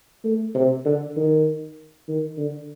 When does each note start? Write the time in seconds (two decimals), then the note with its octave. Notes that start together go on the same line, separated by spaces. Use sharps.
0.24 A3
0.54 C3
0.85 D3
1.16 D#3
2.08 D#3
2.37 D3